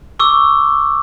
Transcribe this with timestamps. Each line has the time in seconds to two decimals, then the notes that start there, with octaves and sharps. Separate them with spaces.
0.19 C#6 D6 E6